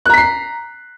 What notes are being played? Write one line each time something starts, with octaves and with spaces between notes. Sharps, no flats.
A#5 F#6 B6 C7